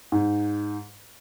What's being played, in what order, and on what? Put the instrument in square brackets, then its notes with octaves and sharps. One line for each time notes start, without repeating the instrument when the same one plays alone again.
[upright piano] G#2